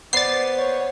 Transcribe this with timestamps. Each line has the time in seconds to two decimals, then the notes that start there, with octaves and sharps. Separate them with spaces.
0.13 B3 C5 D5 A6 C7
0.59 C#5